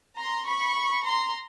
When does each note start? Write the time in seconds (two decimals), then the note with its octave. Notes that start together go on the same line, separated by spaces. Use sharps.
0.17 A#5 C6
0.46 B5 C#6
1.05 A#5 C6